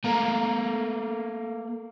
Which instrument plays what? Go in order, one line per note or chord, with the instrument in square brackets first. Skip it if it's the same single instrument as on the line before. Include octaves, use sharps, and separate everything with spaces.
[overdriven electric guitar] A3 A#3 [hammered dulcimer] A#5